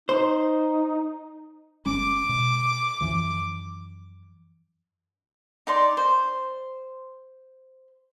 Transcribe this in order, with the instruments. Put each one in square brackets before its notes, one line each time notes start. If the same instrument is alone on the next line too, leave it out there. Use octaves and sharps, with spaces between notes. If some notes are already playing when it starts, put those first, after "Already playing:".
[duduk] D#4 [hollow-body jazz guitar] C5
[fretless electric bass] G1 G#3 C#4 [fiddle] D6
[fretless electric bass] B2
F#2 E3 F3
[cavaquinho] D#4 D5 C6
C5